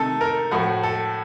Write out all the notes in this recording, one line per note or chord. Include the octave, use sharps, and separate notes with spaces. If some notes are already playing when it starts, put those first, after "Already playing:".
Already playing: C3 D#3 A3 A4
A#4
A2 F3 A3 F#4
A4